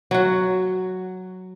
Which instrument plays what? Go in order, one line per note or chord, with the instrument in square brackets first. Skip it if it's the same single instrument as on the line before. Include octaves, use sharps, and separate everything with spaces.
[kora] F#3 F#4